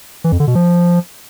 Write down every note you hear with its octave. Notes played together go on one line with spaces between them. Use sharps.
E3
F2
D3
B2
F3